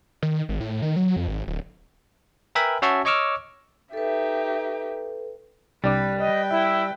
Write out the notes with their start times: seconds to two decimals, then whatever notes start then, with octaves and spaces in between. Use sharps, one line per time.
0.23 D#3
0.49 G#1
0.60 A2
0.82 D#3
0.96 F#3
1.16 F2
1.28 G#1
1.47 D1
2.55 A#4 B4 E5 G5 G#5 B5
2.82 C#4 F#4 C#5 E5 A5 C#6
3.05 C#5 D#5 C#6 D6 E6 F6
3.93 D#4 G4 A4 B4 E5
5.84 C2 G3 D4 B4 D5
6.20 B4 D#5 G5
6.51 E4 E5